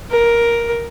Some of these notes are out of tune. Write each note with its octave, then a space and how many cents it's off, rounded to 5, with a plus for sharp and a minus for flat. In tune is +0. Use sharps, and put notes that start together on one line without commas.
A#4 +10